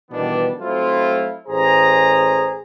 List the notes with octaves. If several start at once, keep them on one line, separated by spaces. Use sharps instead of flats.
B2 D#3 E3 G3 B3 D4
F#3 A3 C4 E4 F4
A1 G#4 C5 A#5